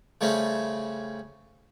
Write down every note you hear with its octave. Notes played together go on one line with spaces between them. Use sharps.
C#3 G3 A3 C4 C#4